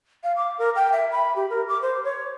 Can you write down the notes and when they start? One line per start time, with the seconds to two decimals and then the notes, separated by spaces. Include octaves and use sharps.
0.24 F5
0.37 D6
0.59 A#4
0.76 G5
0.92 E5
1.12 B5
1.36 G4
1.50 A#4
1.69 D6
1.82 C5
2.04 C#5